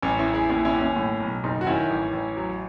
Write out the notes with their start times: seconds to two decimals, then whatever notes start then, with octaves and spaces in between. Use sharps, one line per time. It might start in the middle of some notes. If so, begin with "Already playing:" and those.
0.03 A1 C#4
0.19 C#4 E4
0.26 A1
0.34 E4 G#4
0.49 D#2 C#4 E4
0.65 C#4 E4
0.73 D#2
0.81 C#4
0.96 A2
1.20 B1
1.44 F#1 D#4
1.61 F#4
1.67 D#3 C#4 E4
1.90 A1
2.13 A1
2.37 F#3